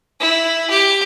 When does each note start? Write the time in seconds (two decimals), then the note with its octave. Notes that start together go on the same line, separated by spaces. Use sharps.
0.20 E4
0.70 G4